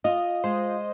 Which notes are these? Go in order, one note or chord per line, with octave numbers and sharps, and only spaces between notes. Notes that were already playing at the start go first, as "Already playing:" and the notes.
F4 D#5
G#3 C5